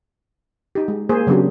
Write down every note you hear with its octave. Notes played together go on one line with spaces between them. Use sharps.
D#4 G4
G#3
A#3 G#4 C5
C#3 F#3 B3 D4 G4